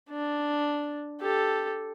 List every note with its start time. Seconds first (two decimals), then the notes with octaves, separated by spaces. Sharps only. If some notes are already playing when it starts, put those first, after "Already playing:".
0.11 D4
1.20 G4 A4